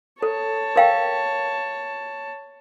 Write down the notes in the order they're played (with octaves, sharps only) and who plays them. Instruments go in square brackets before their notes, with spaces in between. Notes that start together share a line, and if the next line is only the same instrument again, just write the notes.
[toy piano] A4 [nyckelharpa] C#5 A5
[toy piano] A#4 F5 G5